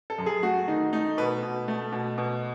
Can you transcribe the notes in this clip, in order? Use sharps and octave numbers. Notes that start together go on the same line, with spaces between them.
A4
F#2
G#4
A3 F#4
D#3 D#4
A3 D#4
B2 B4
B2
A3
B2
B2